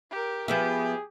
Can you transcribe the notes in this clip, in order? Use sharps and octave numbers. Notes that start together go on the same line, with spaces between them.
G4 A#4
F3 B3 G4 G#4 E5